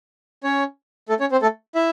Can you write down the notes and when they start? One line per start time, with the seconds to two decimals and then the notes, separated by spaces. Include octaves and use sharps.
0.44 C#4 C#5
1.09 A3 A4
1.20 C#4 C#5
1.32 C4 C5
1.42 A3 A4
1.75 E4 E5